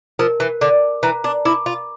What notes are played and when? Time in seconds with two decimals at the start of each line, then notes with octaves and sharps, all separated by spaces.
0.19 F3 A#4
0.40 E3
0.61 D3 D6
1.03 E3 A#5
1.24 D4
1.45 E4 D6
1.66 F4